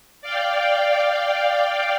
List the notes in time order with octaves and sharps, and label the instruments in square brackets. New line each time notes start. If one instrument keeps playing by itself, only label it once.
[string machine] D5 F5 G5